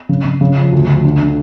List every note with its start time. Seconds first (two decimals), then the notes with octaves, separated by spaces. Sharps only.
0.09 C#3
0.25 C#3
0.41 C#3
0.57 F3
0.72 D2
0.88 D2
1.04 D3
1.21 D3